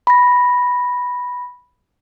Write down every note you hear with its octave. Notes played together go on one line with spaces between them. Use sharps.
B5 A#6